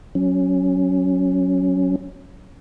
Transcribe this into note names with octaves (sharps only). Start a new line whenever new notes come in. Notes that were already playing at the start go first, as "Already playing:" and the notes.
F#3 C#4